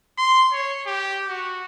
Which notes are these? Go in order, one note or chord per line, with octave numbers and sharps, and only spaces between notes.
C6
C#5
G4
F#4